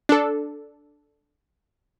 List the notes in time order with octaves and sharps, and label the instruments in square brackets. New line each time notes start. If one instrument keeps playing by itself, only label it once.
[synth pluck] D4 A4